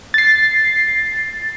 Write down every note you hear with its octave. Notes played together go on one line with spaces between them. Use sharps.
A6 C7